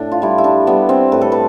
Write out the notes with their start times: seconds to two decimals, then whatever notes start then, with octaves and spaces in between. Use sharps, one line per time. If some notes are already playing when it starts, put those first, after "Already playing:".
Already playing: A2 D4
0.12 F4
0.22 G3 E4
0.38 E4
0.44 D4
0.67 G3 B3
0.89 C4
1.12 A2 B4
1.21 A4
1.32 B4